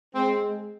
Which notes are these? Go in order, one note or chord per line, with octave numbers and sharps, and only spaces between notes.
G#3 C4